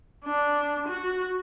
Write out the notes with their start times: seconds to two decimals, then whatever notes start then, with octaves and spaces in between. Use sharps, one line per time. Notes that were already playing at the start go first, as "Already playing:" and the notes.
0.25 D4
0.88 F#4